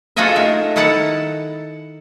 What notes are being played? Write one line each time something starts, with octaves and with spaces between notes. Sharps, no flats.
F4 F#4 G#4 A4 D#5 E5
A3 D#4 A#4
D#3 E4 A4 F#5 A5 A#5